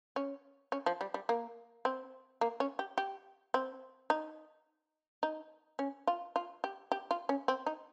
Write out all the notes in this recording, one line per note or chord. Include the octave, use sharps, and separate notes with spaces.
C#4
C#4
F3
G3
G3
A#3
C4
A#3
C#4
G4
G4
C4
D#4
D#4
C#4
F4
F4
G4
G4
F4
C#4
C4
D#4